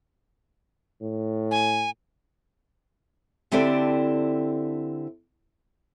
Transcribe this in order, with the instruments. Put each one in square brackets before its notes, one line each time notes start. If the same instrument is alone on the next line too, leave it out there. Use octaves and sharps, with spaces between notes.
[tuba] A2
[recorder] G#5
[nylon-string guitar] D3 C4 E4 G4 A4 D5